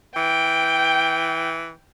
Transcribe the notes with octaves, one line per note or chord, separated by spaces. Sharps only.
E3 G5